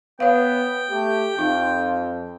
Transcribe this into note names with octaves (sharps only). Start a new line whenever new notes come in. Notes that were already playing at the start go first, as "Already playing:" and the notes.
B3 C#5 F5 G5
A3 G4
F2 D#4 F4